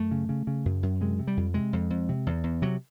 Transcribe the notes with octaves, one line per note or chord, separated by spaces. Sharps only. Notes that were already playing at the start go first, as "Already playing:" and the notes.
Already playing: F#2 A3
C#3
C#3
C#3
F#2
F#2
C3 G#3
C3
G3
F2
C3 G#3
F2
F2
C3
E2
E2
C3 F#3